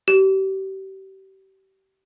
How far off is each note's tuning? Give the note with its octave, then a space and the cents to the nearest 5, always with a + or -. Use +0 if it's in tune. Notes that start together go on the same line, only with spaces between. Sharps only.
G4 -35